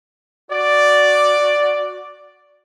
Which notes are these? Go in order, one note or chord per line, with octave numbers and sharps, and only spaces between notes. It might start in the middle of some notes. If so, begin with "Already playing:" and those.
F#4 D5